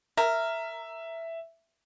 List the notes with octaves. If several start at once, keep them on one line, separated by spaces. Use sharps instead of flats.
A#4 E5